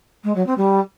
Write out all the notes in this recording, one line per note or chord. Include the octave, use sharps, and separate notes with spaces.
G#3
F#3
C4
G3